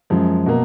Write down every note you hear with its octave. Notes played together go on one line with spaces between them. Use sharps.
F#2 F3 G#3
B2 A#3